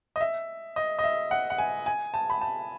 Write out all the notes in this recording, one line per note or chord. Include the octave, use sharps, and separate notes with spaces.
D#5
E5
D#5
D#5
E5
F#5
F#5
G#5
G#5
A5
B5
A5